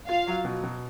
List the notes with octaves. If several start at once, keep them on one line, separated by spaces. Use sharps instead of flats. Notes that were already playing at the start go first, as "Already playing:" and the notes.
F4 F5
F#3
B2
B2